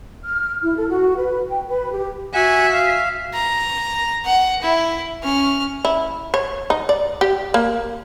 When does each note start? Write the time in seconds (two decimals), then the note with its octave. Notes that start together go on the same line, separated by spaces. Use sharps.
0.23 F6
0.63 E4
0.76 A4
0.88 F#4
1.16 B4
1.48 G5
1.68 B4
1.92 G4
2.34 F#4 E5 F#5 G#5
2.73 F5
3.33 A#5
4.25 F#5
4.62 E4
5.23 C#4 F6
5.85 E4
6.34 C#5
6.70 D#4
6.89 D5
7.21 G4
7.54 A#3